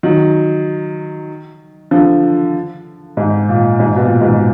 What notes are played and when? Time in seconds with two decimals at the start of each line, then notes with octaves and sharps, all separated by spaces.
0.03 D#3 F#3
1.91 D3 F3
3.17 G#2
3.49 A#2
3.80 G#2
3.96 B2
4.01 A#2
4.21 G#2 B2